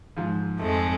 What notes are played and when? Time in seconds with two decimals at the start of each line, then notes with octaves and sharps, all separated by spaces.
0.17 G#2 F3
0.58 F2 G#3 A3